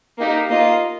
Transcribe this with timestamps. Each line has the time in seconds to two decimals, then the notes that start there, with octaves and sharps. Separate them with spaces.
0.19 A#3 D#4 G4
0.50 A#3 F4 D#5